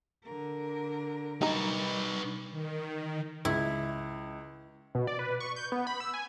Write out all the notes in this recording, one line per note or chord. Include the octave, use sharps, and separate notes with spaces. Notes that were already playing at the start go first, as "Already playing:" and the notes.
D3 A#4
D#3 G3 D#4 B4 A#5
D#3
C#2 E4
B2
D5
B4
C#6
G6
B3
B5
E6
G#5